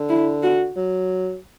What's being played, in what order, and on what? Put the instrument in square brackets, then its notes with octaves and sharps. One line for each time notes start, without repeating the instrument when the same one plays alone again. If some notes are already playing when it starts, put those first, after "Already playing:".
Already playing: [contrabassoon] D3
[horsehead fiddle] E4
F#4
[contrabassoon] F#3